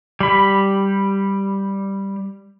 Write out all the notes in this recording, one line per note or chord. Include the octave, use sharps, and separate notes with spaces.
G3 B5